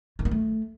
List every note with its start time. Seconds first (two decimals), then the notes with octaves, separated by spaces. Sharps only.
0.19 D#3
0.25 A#3
0.31 A3